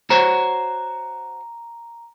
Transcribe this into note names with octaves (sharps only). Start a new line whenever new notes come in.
F#4 C5 C#5 A#5